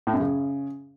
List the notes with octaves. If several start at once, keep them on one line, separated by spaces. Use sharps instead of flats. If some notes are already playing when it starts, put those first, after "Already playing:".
A2
F#2
C#3